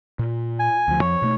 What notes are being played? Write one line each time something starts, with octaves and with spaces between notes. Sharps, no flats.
A#2
G#5
D2 F3
F2 F3 C#5
B2 A3